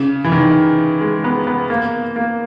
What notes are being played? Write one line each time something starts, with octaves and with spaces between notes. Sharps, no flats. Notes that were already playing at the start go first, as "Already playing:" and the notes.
Already playing: C#3
E3
D#3
G#3
B3
B3
A#3
A#3